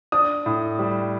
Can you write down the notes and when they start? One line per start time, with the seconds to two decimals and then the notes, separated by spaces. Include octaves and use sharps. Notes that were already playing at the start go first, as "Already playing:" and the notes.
0.12 D4 D#6
0.46 A2
0.79 G3